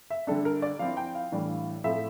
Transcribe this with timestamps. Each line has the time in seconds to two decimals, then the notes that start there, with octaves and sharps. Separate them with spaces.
0.10 E5
0.27 D3 G3 D4 A4
0.45 A#4
0.62 D5
0.79 F3 C4 E4 F5
0.97 G5
1.15 F5
1.32 A2 E3 G3 D4
1.84 A2 F3 A3 C4 E4 E5